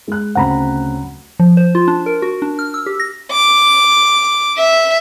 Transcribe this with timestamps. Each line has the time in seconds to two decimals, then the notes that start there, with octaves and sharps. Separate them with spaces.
0.08 G#3 F#6
0.36 D2 C#3 C4 F#5 A#5 B5
1.40 F3
1.57 C5
1.75 F4
1.88 D4
2.06 A#4
2.22 F#4
2.42 D4
2.59 F6
2.74 E6
2.86 G4
3.00 A#6
3.32 D6
4.57 E5